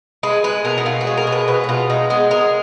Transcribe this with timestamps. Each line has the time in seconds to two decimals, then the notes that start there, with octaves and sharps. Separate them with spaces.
0.23 G#3 B4
0.44 G#3 B4
0.65 B2 A#4
0.78 D#4
0.86 B2 F4
1.01 F#4
1.07 G#3
1.17 A#4
1.27 B2
1.32 B4
1.48 B2 B4
1.64 F#4
1.69 B2 F4
1.90 G#3 D#4
2.10 G#3 B3
2.31 G#3 A#4